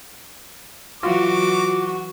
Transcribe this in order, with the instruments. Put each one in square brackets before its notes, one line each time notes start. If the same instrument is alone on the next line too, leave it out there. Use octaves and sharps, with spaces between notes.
[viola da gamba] E3 F#3 [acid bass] F4 [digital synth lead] F#4 [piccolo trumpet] D6